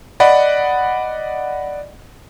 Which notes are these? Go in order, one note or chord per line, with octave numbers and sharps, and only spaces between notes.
D5 D#5 F#5 B5